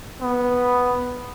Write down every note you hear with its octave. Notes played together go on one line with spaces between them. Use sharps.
B3